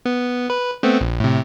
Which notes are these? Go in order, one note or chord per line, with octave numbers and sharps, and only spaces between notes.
B3
B4
A3 B3 C4
A#1
A2 C3